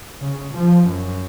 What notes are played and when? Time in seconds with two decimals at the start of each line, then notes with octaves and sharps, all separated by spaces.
0.21 C#3
0.53 F3
0.86 F#2